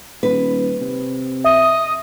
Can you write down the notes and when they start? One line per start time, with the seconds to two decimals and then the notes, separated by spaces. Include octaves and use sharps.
0.23 D#1 B4
0.80 C3
1.44 D#5 E5